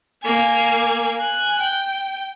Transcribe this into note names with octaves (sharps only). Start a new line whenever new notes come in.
A#3 G#5
G#5 F#6
G5